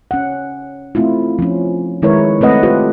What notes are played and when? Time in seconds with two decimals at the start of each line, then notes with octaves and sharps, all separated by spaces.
0.11 C#4 F#5
0.95 A3 C4 E4 F4
1.39 F3 C#4
2.02 D#3 G#3 E4 A#4 B4 C#5
2.41 A3 C4 B4 D#5 F#5
2.63 F4 G4 A4 B4